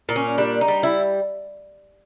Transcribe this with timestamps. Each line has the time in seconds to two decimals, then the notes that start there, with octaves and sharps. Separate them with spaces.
0.09 A#2
0.16 C#4
0.38 G3 D4
0.61 D#4
0.68 G3
0.83 E4